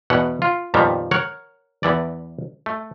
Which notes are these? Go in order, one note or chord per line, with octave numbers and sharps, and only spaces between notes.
E2 B2 F#5
F4
F2 A#2 D#3 F3 G3 B3
A#4 C#5 F#5
E2 E3 D5
A3